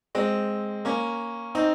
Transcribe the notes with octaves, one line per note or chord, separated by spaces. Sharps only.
G#3 C4
A#3 C#4
C4 D#4